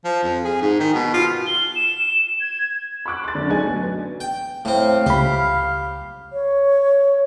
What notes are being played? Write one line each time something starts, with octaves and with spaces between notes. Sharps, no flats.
F3
F2
G#4
G#2
D#3
B2
F4
G7
E7
G#6
B5 C#6 D6 F#6
C6 A6
F#2 D3
A3 D#4 G#4 G#5
B2 F#3
B3
G5
A2 C4 F5
C#2 G4 B5
C#5